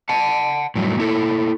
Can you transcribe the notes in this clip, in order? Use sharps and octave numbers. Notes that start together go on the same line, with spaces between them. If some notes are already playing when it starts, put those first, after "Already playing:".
F#5 A5
A2 F#3 G3
A#3 E4 A4